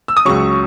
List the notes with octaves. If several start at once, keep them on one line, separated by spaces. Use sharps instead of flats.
E6
D#6
C#2 C#3 F#3 C#6